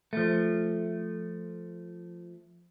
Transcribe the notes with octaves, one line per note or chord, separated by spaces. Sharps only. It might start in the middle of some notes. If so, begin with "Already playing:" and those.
F3 A3